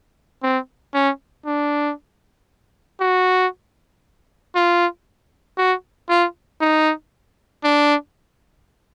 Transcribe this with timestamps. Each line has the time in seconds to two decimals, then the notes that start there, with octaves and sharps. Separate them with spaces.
0.43 C4
0.94 C#4
1.46 D4
3.00 F#4
4.55 F4
5.58 F#4
6.10 F4
6.61 D#4
7.64 D4